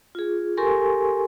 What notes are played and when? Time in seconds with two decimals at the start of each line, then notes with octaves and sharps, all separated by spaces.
0.15 F4 G#4
0.57 G4 A4 A#4 G#5 C6 C#6